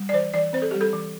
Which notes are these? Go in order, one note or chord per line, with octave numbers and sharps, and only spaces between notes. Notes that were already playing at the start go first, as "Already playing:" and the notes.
Already playing: G3
D5
E3 C5
E3 D5
C4 C5
A4
G3 G4
A4
E3